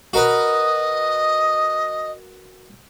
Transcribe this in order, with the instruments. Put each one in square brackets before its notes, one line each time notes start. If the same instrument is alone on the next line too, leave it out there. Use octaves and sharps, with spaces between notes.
[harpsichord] F#4 A#4 B4 [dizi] D#5